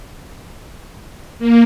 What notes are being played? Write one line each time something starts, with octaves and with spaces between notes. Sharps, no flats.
A#3